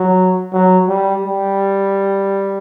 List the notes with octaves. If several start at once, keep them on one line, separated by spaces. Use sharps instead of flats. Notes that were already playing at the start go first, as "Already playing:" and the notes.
Already playing: F#3
F#3
G3
G3